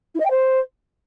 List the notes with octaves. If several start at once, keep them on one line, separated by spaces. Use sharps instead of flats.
E4
D#5
G5
C5